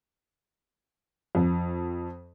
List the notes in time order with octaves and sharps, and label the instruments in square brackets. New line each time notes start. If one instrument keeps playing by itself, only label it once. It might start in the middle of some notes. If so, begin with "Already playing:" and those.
[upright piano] F2